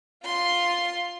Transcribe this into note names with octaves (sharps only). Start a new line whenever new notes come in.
F4 C6